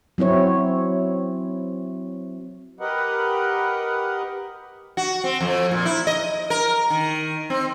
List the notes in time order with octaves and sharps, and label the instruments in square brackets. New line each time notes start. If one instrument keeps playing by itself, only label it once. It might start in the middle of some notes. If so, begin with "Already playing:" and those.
[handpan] F#3 C4 E4 C#5
[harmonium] G4 A#4 B4 D#5 F#5
[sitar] F#4
C4
F2
A#2
E4
D#5
A#4
D#3
C4